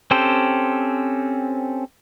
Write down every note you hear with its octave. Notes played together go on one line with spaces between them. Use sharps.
C4 C#4 G4 A4 C5